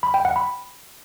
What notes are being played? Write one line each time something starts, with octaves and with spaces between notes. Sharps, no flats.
B5
G5
F#5
B5